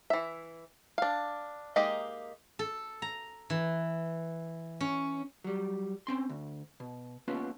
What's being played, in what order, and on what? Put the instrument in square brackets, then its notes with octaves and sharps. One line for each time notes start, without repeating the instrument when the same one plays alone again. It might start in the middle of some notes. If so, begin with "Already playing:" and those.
[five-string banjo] E3 E5
D4 F5
G#3 A#3 D#4 G4 D#5
[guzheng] A4
A#5
E3
C#4
[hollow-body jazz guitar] F#3 G3
C4 C#4 C6
D2
B2
A#3 B3 C#4 F4 B4